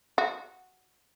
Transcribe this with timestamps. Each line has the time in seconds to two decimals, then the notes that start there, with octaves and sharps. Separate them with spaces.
0.18 F#4